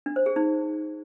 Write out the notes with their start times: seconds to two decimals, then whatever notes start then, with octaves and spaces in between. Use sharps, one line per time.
0.06 D4
0.16 C5
0.26 G#4
0.36 D#4